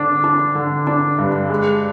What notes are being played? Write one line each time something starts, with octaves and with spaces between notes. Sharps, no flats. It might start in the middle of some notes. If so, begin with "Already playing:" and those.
Already playing: D3 D4
D4
D3
D4
G2
G#3